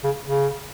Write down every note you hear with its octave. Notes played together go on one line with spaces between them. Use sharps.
C#3
C#3